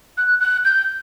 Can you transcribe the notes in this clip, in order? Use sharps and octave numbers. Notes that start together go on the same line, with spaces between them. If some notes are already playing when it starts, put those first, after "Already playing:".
F#6
F#6
G6